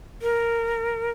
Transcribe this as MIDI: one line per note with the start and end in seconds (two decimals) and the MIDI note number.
0.22 1.10 70